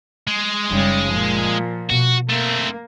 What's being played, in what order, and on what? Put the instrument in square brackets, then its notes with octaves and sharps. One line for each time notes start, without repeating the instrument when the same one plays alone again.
[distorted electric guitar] G#3
[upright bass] F#1 D#4 [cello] C#3 G3
[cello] A#2 F3
[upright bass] B2 [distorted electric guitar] F#4
[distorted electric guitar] A3 C4 [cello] A#3